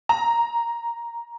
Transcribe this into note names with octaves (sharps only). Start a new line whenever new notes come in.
A#5